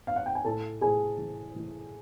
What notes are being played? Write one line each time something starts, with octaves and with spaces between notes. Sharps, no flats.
F5
F#5
G5
G#5
A2 A4 A5
A2 G#4 G#5
E3
E3